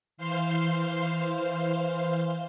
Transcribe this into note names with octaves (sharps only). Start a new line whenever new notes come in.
E3 C5 F5 C6